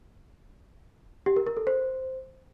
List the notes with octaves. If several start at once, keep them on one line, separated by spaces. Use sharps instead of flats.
G4
A#4
A#4
A4
C5